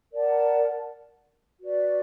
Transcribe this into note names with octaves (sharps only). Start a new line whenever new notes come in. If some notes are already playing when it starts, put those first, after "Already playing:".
A#4 D5 F#5 A5
F#4 B4 D5